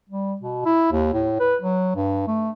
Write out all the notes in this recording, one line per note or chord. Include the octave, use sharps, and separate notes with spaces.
G3
B2
E4
D#2
A2
B4
F#3
G2
A3